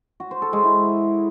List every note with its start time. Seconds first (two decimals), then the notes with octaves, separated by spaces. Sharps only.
0.20 F#4
0.31 C5
0.42 A4
0.53 G#3
0.64 E4